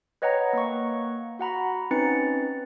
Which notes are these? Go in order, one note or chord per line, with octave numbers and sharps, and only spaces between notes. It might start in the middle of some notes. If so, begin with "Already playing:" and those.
B4 C#5 D#5 F#5 G5 A#5
A#3 F#5 C#6
F#4 F#5 A#5 B5
C4 C#4 D#4 B4 A6 C#7